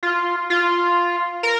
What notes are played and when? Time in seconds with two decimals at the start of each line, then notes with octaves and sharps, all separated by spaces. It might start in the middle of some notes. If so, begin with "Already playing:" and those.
0.03 F4
0.50 F4
1.43 A#4